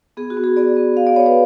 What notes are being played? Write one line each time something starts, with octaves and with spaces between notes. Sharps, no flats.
B3 G#4
F#4
B3
G#4
B3 D5
B3
B3 F5
D5
B3 C#5
B4